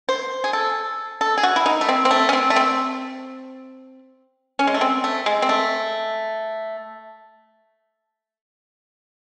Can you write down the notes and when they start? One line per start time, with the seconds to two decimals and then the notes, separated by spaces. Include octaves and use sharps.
0.09 C5
0.44 G#4
0.53 A4
1.21 A4
1.38 G#4
1.43 F#4
1.56 E4
1.66 D#4
1.81 A3
1.89 C4
2.05 C4
2.11 A3
2.29 C#4
2.33 C4
2.50 A3
2.56 C4
4.59 C#4
4.67 G#3
4.74 A3
4.81 C4
5.04 A3
5.26 G#3
5.42 C4
5.49 A3